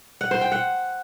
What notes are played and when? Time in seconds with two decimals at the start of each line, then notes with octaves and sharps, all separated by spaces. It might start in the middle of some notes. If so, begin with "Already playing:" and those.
0.21 F#5
0.31 C5
0.41 G5
0.52 F#5